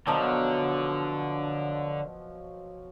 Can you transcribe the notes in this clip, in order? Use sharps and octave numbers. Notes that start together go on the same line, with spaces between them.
B2 D3 F3 F#3